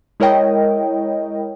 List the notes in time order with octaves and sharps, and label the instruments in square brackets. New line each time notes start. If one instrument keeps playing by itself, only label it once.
[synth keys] G#3 E4 A#4 C#5 D#5 G5